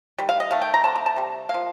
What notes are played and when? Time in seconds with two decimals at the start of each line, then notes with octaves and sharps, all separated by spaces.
0.18 D#3 G3
0.29 F5
0.40 D#5
0.51 D#3 A3 F5
0.62 G5
0.74 A#5
0.83 D3 A3 C4 A5
0.96 A#5
1.06 A5
1.16 C3 G3
1.49 F3 A#3 F5